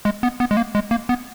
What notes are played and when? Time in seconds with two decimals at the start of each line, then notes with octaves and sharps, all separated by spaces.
0.05 G#3
0.23 B3
0.40 B3
0.51 G#3
0.57 A#3
0.75 G#3
0.91 A#3
1.09 B3